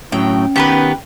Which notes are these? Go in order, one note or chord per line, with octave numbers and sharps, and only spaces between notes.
A2 F#3 C#4 G5
D#3 B3 G4 A4 B4